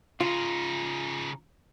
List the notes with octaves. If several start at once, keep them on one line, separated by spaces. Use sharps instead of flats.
C#3 D#4 F4